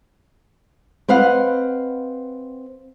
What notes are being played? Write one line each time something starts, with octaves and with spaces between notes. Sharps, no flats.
C4 B4 D#5 F5 F#5